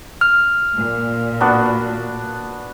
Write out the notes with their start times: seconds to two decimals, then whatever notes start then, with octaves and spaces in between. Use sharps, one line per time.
0.21 F6
0.77 A#2
1.40 B3 D4 F#4